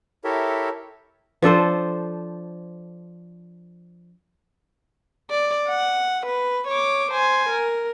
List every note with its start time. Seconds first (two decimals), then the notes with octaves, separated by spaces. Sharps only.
0.24 E4 G4 A4 A#4 C#5 E5
1.42 F3 D4 A4 C5
5.31 D5
5.68 F#5
6.26 B4
6.67 C#5 D6
7.11 C5 G#5
7.49 A#4